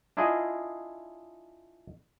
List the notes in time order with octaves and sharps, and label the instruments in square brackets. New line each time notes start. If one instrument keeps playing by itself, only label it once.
[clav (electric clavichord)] D4 E4 F4 G#4 D#5